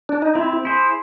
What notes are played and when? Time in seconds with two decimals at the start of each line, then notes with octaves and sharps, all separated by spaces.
0.09 D4
0.22 D#4
0.35 C4 E4
0.65 E4 G#4 C5